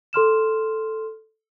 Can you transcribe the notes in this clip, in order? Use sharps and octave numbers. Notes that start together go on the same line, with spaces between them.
A4 C6 F6 E7